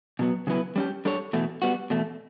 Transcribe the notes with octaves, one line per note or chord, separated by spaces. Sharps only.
B2 F#3 B3
C#3 F#3 B3 E4 B4
G3 C#4 G4
G3 D4 A4 C#5
E2 B2 A3
G3 B3 F#4
E2 B2 A3